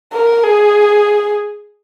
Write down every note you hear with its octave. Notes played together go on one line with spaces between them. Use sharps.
A#4
G#4